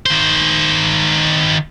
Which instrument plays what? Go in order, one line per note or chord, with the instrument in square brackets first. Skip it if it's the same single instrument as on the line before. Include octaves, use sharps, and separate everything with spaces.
[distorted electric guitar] D#3 C5